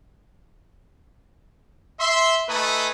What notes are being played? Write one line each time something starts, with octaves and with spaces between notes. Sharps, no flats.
E5 C6
A3 D#4 A4 B4 G#5 D#6